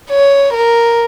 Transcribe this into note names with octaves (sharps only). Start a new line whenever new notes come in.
C#5
A#4